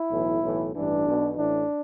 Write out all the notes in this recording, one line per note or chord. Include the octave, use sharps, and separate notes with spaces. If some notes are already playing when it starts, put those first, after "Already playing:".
Already playing: E4
B1 A2 E3
B1 A2 E3
A1 G2 E3 D4
B1 B2
A1 A2 E3 D4